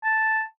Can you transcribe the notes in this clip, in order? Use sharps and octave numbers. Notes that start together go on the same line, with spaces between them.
A5